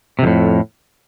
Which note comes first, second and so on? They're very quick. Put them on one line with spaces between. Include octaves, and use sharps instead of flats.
C3 F2 A2